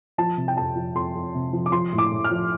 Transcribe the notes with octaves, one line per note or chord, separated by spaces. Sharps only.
F3 A5
C3
G5
F2 A5
F3
F2 C6
F2
C3
F3
D6
F3 C6
A2
D6
A2
F6
F3